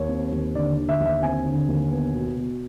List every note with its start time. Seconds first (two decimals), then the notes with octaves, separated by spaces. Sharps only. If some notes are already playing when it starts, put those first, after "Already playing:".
Already playing: D#2 C#5
0.09 C4
0.32 D#2
0.55 D3 D5
0.77 D3
0.89 E5
1.00 D#2
1.06 E5
1.22 C4 G#5
1.46 D3
1.68 D#2
1.92 B3
2.13 B2
2.37 B2